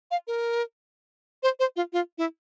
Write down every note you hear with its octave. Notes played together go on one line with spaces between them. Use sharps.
F5
A#4
C5
C5
F4
F4
E4